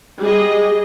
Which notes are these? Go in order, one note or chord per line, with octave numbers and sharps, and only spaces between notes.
G3 G#4 D#5